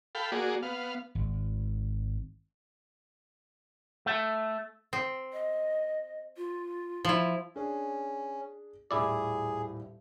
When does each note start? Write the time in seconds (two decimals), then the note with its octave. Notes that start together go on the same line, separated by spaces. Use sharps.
0.15 A4 F5 G5 B5
0.32 A#3 F#4 G#4 D5
0.62 B3 F5
1.15 G#1
4.06 A3
4.93 C4
5.33 D#5
6.37 F4
7.05 F3 E4
7.56 C#4 D4 G#4
8.91 D#1 A2 E4 G4 G#4 D5